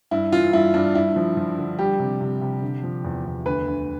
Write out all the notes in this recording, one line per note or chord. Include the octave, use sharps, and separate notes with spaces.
G2 E4
E3 F4
G2 E4
G2 D4
G2 E4
F3
F3
D3
G3 G4
C3
C3
C3
D3
F3
E2
E2
D2 B4
D2